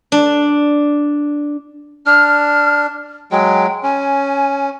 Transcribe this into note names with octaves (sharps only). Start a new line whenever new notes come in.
D4
D4 F6
F#3 G#3 G5
C#4 G#5